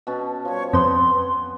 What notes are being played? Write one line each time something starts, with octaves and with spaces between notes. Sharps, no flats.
B2 C#4 A5
F3 G3 C#5
F2 B3 C5 C6